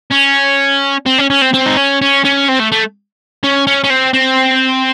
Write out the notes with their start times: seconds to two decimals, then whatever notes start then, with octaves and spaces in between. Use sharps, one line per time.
0.11 C#4
1.06 C4
1.18 C#4
1.30 C#4
1.42 C4
1.54 C4
1.66 D#4
1.77 C#4
2.02 C#4
2.25 C#4
2.49 C4
2.60 A3
2.72 A3
3.43 C#4
3.67 C#4
3.84 C#4
3.90 C4
4.14 C4